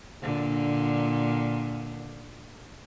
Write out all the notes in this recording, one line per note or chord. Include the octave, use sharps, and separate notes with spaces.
A#2 D3